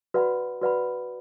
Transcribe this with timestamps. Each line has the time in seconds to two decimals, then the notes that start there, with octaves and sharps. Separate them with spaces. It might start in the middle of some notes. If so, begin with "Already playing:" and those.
0.14 F#4 B4 D5 F#5 B5
0.61 F#4 B4 D5 F#5 B5